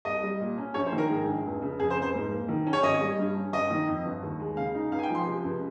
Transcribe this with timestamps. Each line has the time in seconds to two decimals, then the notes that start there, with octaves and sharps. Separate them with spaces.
0.05 C2 D#5
0.23 G3
0.40 A#2
0.58 C#4
0.74 A#1 C#5
0.86 C5
0.92 D#3
0.98 A#4
1.09 G#2 G#4
1.28 A#1
1.45 F1
1.62 C#3
1.79 F2 G#4
1.90 C5
1.97 F1
2.02 C5
2.14 G#2
2.31 A#3
2.48 D#3
2.67 C#4
2.73 C#5
2.83 G#1 D#5
3.01 G3
3.18 G2
3.35 C#4
3.53 G1 D#5
3.70 D#3
3.88 F2
4.05 G1
4.23 D#2
4.40 G#3
4.57 C#3 F5
4.75 D#4
4.91 C#2 F5
4.99 G#5
5.03 G5
5.09 F3
5.15 C6
5.27 C3
5.44 C#2